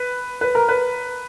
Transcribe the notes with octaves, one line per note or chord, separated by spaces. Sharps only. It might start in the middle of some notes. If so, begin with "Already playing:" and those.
Already playing: B4
B4
A#4
B4